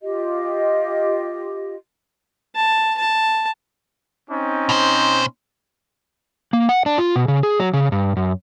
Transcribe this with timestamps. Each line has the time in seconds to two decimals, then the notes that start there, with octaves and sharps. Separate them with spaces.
0.02 F4 G4 D#5
2.56 A5
2.98 A5
4.29 C4 C#4 D#4
4.69 B2 C5
6.53 A#3
6.69 F#5
6.86 D4
6.98 F4
7.16 B2
7.28 C#3
7.43 G#4
7.60 F#3
7.73 C#3
7.92 G2
8.17 F#2